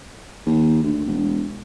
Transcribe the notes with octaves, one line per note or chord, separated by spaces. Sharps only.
D#2
D2
E1